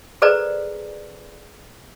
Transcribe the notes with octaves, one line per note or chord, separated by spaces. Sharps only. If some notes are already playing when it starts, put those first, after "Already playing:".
G#4 A4 B4 C5 D5 A#5